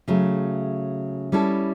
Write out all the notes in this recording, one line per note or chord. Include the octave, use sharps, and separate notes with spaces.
C#3 F#3 A3
G3 C#4 E4 A4